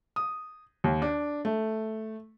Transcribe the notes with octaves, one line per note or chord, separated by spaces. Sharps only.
D#6
D#2
D4
A3